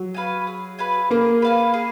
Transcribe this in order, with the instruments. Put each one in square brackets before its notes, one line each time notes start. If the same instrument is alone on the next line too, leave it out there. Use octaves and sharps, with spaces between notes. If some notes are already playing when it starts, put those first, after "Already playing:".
Already playing: [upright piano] F#3
[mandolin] B4 F5 G#5
G#4
B4 F5 G#5
[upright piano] A#3 [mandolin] G#4
[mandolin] B4 F5 G#5
G#4